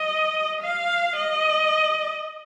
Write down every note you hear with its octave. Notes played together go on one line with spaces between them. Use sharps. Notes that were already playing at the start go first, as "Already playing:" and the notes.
Already playing: D#5
F5
D#5